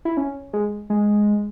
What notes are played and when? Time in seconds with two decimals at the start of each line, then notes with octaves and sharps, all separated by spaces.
0.05 E4
0.17 C#4
0.53 G#3
0.90 G#3